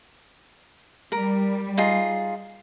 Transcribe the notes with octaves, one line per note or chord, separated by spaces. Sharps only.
G3 A#4
D#4 F4 G#4